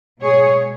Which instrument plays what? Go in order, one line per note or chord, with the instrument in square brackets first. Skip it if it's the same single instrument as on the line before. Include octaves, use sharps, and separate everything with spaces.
[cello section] B2 G#3 G#4 C#5